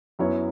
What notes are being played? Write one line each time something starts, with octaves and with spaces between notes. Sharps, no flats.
F#2 F#3 B3 E4 C#5